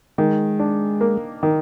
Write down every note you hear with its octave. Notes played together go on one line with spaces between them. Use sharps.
D#3 G#3
D4
A#3
D#3